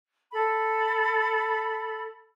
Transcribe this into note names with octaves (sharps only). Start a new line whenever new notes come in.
A4 B5